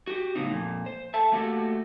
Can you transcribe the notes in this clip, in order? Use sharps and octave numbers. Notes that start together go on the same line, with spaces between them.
F#4 G4
A2 C#3 F#3 B3 D#4
F2 A#2
C5
A4 E5 A5
A3 A#3 F#4 G4 A4